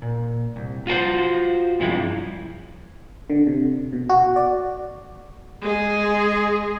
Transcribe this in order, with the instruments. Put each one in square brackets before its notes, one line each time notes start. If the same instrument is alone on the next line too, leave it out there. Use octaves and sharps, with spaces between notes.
[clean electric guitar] A#2
C2
F4 F#4 A#4 C5
G2 C3 F3 G#3 E4
[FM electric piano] D3
C3
B2
F#4
D5
[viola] G#3 G#4